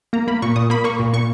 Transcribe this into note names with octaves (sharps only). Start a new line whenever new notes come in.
A#3 A#5
A#3 B5
A#2 C#6
A#2 D#6
A#3 B5
A#3 C#6
A#2
A#2 C#6